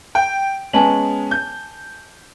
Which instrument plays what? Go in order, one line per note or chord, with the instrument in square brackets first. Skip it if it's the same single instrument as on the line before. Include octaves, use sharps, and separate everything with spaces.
[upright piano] G5
[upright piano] G#3 B3 C#4 [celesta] G#5 A5 F#7
[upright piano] G6